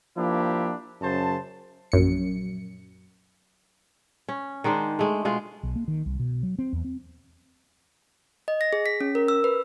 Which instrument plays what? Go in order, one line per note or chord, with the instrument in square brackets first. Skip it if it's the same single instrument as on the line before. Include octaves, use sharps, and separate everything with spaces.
[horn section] F3 A#3 D4 E4 G4
F#2 C#3 C5 A5
[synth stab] A#1 F#2 C#7
[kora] C#4
D#3 G#3 D4 C5
G#3 A3
B2 G#3 F4
[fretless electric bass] B1
A#3
D#3
C2
B2
F#3
C4
E2
C4
[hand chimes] D#5
A#6
G#4
B6
C#4
A#4
E6
B4